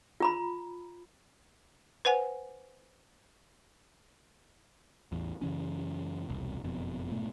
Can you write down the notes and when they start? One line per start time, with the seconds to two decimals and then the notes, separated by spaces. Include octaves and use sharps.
0.20 F4 A#5 B5
2.05 B4 C5 F#5 G#5
5.12 A1 E2
5.42 F#2 C#3 E3 C#4
6.29 E1 C2
6.64 F#1 F2 B2
7.11 F1 G#2 B2 A3